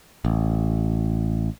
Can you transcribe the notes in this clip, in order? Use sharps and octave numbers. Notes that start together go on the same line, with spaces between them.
A1